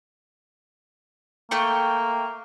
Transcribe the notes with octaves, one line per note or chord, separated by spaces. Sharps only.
A3 A#3 G5 C#6